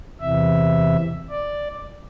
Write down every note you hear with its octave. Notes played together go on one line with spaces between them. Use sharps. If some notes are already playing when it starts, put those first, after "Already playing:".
E2 C3 E3 E5
D5